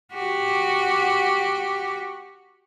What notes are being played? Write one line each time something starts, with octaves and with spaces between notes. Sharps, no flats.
F#4 G4